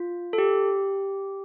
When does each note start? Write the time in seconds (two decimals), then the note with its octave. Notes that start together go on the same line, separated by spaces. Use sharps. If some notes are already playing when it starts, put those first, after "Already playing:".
Already playing: F4
0.33 A4
0.38 G4